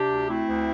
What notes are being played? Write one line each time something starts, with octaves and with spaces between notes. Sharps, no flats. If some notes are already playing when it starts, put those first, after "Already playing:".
Already playing: C3 D4 G4
D2
A3 C4 E4
D2